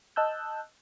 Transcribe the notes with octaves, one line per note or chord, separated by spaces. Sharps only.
D#5 A5 E6 F#6 G6